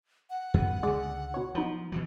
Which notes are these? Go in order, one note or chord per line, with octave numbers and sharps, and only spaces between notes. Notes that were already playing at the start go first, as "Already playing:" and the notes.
F#5
F#2 B3
C#2 D3 G#3 G#4 D5
B2 C#5
F3 F#3 B3 D#4
B2 E3 F#3